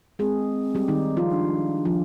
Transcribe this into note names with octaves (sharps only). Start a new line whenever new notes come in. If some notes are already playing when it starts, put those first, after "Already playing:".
G#3 C4 G#4
G3 G4
D#3 D#4
F3 F4
D4
F3 F4